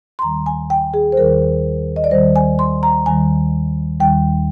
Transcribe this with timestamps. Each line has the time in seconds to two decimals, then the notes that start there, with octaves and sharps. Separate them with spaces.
0.19 C6
0.22 D#2 D#3 G3 A#5
0.46 G#5
0.70 G5
0.94 G#4
1.12 C5
1.17 D#2 D#3 G3 A#4
1.96 D#5
2.04 D5
2.11 D#2 D#3 G3 C5
2.36 G#5
2.59 C6
2.83 A#5
3.06 D#2 D#3 G3 G#5
4.00 D#2 D#3 G3 G5